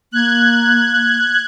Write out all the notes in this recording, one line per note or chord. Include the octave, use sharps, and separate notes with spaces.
A#3 F#6 G#6